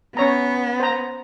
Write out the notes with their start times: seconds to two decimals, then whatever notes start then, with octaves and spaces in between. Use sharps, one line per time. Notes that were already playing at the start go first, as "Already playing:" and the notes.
0.17 B3 C#4 C#5 A#5
0.80 C5 A#5